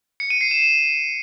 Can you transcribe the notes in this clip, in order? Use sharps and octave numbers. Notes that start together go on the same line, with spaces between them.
C#7
D#7
C7
E7
E7